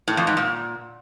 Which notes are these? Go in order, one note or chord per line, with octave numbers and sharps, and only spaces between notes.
A2
F2
G#2
A#2